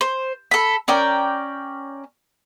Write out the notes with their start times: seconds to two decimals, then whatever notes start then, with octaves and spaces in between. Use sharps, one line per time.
0.01 C5
0.51 A4 B5
0.88 C#4 A#4 D5 G5